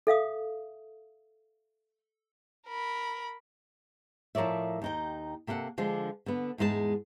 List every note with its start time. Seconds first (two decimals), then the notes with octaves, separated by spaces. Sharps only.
0.07 A4 E5 F5 D#6
2.68 A#4 B5
4.35 A2 F3 A#4 C#5 D5 E5
4.82 D#2 D#4 G5
5.47 C3 A#3 A4 F5 F#5
5.78 D3 F3 G#3 D4
6.26 D3 B3
6.58 E2 G#2 G#3 G4 A5